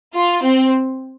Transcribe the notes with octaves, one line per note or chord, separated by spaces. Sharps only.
F4
C4